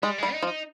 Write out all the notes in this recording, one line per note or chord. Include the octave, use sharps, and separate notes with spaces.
G3 G#3
G3 G#3
D#4
F3
D#4